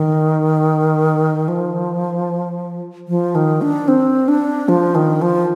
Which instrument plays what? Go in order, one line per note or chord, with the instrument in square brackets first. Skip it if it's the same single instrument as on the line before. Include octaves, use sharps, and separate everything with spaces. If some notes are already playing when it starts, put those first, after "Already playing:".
Already playing: [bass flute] D#3
F3
F3
D#3
D4
C4
D4
F3
D#3
F3